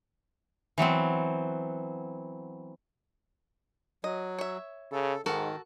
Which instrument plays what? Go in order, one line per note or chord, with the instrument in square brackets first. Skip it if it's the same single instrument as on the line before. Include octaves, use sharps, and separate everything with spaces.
[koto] E3 F#3 B3 C4
[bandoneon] F#3 [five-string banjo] D#5
[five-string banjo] C#5 E5
[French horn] C#3 [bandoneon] A4
[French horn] G#2 [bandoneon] D#3 [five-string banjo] F#4 A4 A#4